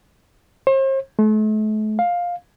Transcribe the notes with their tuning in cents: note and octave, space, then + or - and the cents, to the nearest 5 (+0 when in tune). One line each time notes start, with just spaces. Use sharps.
C5 +40
A3 -40
F5 +10